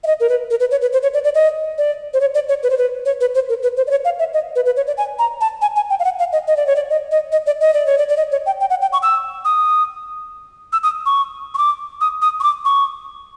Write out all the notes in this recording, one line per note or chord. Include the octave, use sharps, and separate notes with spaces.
E5
D#5
A#4
B4
A#4
B4
C#5
B4
C5
C#5
D5
D5
D#5
D5
C5
C#5
D5
C#5
B4
C5
B4
C#5
B4
C5
A#4
B4
C5
D5
C#5
F5
E5
D#5
B4
B4
C#5
D5
G#5
A#5
A5
G#5
G#5
G5
F5
F#5
F5
D#5
D#5
D5
C#5
D5
D#5
D#5
D#5
D5
D#5
D5
C#5
D5
D5
D#5
C#5
G5
G5
F#5
G5
C#6
E6
D#6
E6
D#6
C#6
C#6
D6
D#6
D#6
C#6
D6
C#6